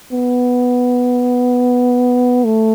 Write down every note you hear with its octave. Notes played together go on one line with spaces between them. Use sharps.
B3
A3